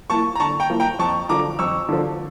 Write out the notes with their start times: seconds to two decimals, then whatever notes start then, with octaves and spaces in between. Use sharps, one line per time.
0.10 F3 A#3 E4 A5 C#6
0.35 A#5
0.40 D3 A5 C#6
0.60 G5 A#5
0.70 F3 A#3 E4
0.80 G5 A#5
0.99 F2 A5 C#6
1.29 D3 F3 A#5 D6
1.59 F2 C#6 E6
1.89 D3 F3